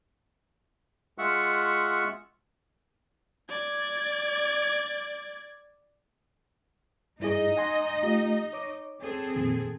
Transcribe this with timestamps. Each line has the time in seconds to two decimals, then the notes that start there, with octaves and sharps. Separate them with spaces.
1.18 G#3 F4 E5 F#5 C#6
3.49 D5 G#6
7.20 G2 D#4 E4 G#4 D#5
7.56 F#5 G#5 C6
8.03 A3 F4 G4
8.53 C#5 D6
9.01 C4 G#4 A4
9.35 F2 A#2 D#3